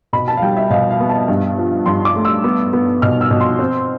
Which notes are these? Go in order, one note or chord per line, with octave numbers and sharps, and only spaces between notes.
B2 B5
A5
F5
G3 G5
E5
B2 F5
F5
B3
A5
G2
F3
G2 C6
D6
A3
E6
B3
B3
B2 F6
E6
B2
C6
C4